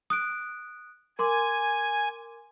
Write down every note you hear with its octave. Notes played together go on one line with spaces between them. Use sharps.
D#6 F#6 D7
A#4 G#5 C6 D6